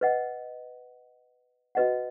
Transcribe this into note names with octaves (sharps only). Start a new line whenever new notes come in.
B4 D#5 F#5
F#4 B4 D#5 F#5